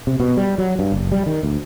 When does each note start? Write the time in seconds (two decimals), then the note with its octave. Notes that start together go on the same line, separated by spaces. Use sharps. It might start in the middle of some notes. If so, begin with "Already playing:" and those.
0.07 C3
0.20 B2
0.37 G3
0.58 F#3
0.79 G2
0.92 F#1
1.12 G3
1.26 D#3
1.43 D2